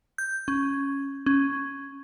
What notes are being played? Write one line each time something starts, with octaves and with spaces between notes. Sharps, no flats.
G6
C#4
C#4